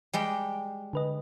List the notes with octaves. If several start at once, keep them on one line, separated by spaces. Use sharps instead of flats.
G3 G#3 G5
D3 B4 D#5